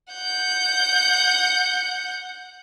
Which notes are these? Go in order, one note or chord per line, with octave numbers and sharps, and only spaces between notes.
F#5 G6